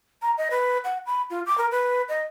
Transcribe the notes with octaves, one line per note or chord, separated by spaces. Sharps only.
A#5
D#5
B4
F#5
B5
F4
D6
A#4
B4
D#5